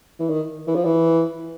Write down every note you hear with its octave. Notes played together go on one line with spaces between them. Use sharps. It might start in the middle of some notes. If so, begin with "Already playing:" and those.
E3
D#3
E3
F3
E3